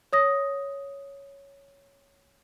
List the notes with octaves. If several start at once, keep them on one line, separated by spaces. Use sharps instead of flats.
C#5 D#6 A#6